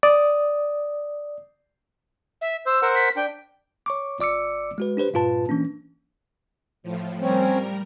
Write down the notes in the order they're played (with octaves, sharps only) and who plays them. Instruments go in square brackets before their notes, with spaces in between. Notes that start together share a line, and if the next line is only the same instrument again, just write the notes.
[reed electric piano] D5 D#6
[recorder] E5
[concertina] C5 [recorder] E6
[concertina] A#4 C5 F#5
[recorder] B6
[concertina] D4 [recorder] G5
[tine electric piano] C#5 C#6 D6
G1 D5 D6 E6 C#7
G#3 F#4 B4
D4 G4 B4 C5
G2 A#2 F4 B4 A5
E3 A#3 C#4 D4
[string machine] A2 F3
[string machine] G3 A#4 [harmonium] C4 C#4